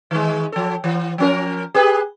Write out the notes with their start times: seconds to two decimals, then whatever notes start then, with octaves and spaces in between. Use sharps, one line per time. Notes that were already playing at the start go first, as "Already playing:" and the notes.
0.11 D#3 G#3
0.52 F3 A4
0.84 E3
1.18 F3 C#4 A#4
1.74 G4 G#4 B4